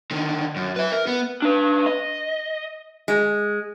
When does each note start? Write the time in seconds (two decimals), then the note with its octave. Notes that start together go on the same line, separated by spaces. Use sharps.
0.11 D3 D#3
0.56 F#2
0.76 B4 E5
0.92 A#4
1.07 B3
1.42 D4 B4
1.86 D#5
3.08 G#3